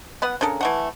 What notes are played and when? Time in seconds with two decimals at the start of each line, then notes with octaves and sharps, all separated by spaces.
0.22 B3 B4 F#5
0.41 C#3 D4 A4 A#4
0.61 E3 A3 F#5